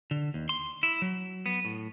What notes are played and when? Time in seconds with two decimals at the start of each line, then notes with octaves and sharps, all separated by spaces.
0.11 D3
0.34 D#2
0.49 C6
0.83 E4
1.02 F#3
1.46 B3
1.65 A2